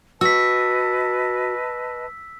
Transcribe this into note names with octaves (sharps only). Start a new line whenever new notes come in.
F#4 B4 D#5 A5 E6 B6